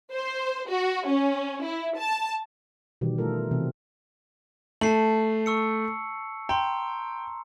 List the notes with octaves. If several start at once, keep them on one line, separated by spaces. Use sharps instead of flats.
C5
F#4
C#4
E4
A5
B2 D#3 E3 G3 G4
A3 F4 A4 A#4
C3 E3 C4
A3 A5 C7 F#7
C#6 E6 C#7
G5 A#5 C6